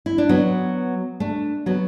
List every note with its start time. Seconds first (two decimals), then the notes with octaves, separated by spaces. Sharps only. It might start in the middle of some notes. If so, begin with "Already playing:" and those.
0.06 E4
0.18 D4
0.29 F#3 B3
1.20 A3 D4
1.66 F#3 B3